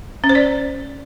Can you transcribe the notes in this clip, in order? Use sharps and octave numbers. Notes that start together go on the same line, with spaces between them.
C#4
C5
D5